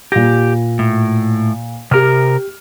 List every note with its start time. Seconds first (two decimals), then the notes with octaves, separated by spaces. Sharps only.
0.12 A#2 G4 A#6
0.79 A2
1.91 C3 G4 A#4 F6